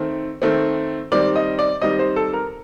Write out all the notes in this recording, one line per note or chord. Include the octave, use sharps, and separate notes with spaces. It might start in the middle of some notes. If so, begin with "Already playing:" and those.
Already playing: D#3 A3 C4
D#3 A3 C4
D#3 G3 C4 D5
D#5
D5
D#3 G3 C4 D#5
C5
A4
A#4